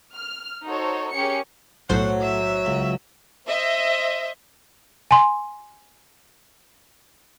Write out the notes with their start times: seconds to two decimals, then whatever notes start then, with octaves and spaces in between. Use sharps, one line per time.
0.15 F6
0.65 D#4 F#4 A4 C5 C#5
1.12 C#4 G4 G#4 A#4 C#5 C#7
1.90 B1 A2 F#3 A3 C5 F#5
2.20 E5
2.66 C#2
3.49 C5 D#5 E5
5.11 G#5 C6